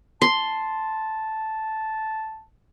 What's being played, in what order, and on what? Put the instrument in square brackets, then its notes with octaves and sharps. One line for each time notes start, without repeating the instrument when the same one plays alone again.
[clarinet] A5 [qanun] C6